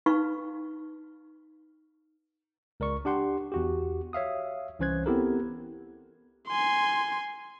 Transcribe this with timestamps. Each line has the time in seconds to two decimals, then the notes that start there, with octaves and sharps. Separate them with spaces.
0.06 D#4 B4 F5 C#6
2.80 C#2 A#4 D5 C#6
3.05 D4 G4 F#5 C6
3.52 E2 F#4 G4
4.13 C#5 E5 F5 D#6
4.79 C2 E3 C#4 C5 F#6 G#6
5.06 B3 C4 E4 G4 A4 A#4
6.48 G#5 C6